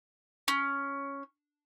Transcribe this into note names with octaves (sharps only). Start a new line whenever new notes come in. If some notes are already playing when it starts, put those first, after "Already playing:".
C#4